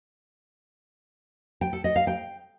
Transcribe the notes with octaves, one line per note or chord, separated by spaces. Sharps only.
G5
A4
D#5
F5
G5